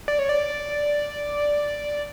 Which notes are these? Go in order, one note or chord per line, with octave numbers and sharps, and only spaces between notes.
D5
C#5
D5